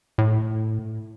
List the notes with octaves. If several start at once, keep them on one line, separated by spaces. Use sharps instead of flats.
A2